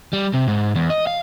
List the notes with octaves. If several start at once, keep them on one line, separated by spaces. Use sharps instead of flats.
G3
C3
G#2
E2
D#5
F5